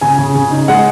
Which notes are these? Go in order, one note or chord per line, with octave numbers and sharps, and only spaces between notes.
C#3 G#5
C#3
C#3
D#4
G#3 F#5